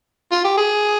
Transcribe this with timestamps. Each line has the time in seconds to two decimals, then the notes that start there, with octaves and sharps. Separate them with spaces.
0.32 F4
0.45 G4
0.58 G#4